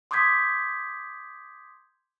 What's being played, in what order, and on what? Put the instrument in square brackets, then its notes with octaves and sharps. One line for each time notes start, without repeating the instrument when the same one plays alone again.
[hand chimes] C6 D6 D#6 G6 G#6 B6